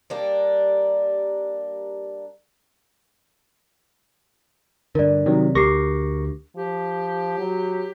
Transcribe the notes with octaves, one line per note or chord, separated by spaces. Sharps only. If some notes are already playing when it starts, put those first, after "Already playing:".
G3 A#3 D4
G2 D3 A#4 D5
C3 D#3 F#3
D2 G4 A#4 C#6 D6 A#6 C7
F3 G4
F#3